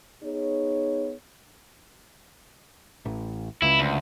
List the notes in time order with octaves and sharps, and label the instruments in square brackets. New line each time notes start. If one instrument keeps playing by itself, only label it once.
[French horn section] B3 D#4 G#4 C#5
[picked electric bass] A1
[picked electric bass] C#2 [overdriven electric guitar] E4
[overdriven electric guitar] D2